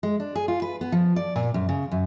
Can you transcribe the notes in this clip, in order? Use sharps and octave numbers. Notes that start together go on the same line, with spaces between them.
G#3
D4
G#4
F4
B4
B3
F3
D5
A#2
F#2
C#3
F#2